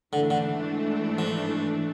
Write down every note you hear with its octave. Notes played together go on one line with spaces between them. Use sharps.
G#2 D3 E3 A3 D4
D3
F3